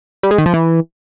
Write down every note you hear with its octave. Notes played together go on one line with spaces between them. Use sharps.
G3
G#3
D#3
F3
E3